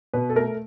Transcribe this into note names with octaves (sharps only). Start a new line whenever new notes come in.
B2 B4
A4
A3 A#4